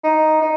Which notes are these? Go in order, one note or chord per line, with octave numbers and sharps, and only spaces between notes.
D#4
D#4